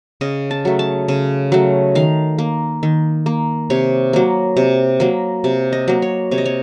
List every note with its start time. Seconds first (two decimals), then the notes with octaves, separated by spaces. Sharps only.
0.21 C#3 D#5
0.51 A5
0.65 F#3 A3
0.79 A5
1.08 C#3
1.52 F#3 A3
1.95 D#3 F5
2.38 A#3
2.83 D#3
3.26 A#3
3.70 C3 C#5
4.13 F#3 A#3
4.57 C3
5.00 F#3 A#3
5.44 C3
5.72 D#5
5.88 F#3 A#3
6.02 C#5
6.31 C3 C#5
6.38 D#5
6.45 C#5